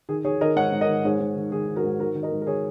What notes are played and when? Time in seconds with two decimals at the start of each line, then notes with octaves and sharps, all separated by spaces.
0.09 D#3 G#4
0.25 D#3 G#4 C#5
0.41 D#3 A#4 D#5
0.56 G#2 C#5 F#5
0.72 G#2
0.81 A#4 D#5
0.89 D#3
1.05 G#2 G#4 C#5
1.20 G#2
1.36 D#3
1.52 D#3 G#4
1.67 D#3
1.76 F#4 A#4
1.84 G#2
1.99 D#3 F#4 A#4
2.15 D#3
2.23 A#4 D#5
2.32 G#2
2.42 A#4
2.47 D#3 G#4 C#5